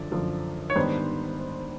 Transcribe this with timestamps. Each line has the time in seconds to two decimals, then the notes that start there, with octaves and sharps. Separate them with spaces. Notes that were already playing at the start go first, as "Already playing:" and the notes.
Already playing: F#2 D3 F3 D5
0.11 F#2 D3 F3
0.70 C#5
0.76 G#2 D#3 G3 B3 D4 C5